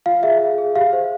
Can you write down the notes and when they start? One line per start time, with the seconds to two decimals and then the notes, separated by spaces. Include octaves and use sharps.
0.06 F4 F5
0.23 G#4 E5
0.41 G#4
0.58 G#4
0.75 G4 F5
0.93 C5